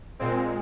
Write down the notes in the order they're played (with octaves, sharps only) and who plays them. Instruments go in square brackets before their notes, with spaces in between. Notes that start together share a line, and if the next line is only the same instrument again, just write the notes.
[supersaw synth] A#2 G#3 C4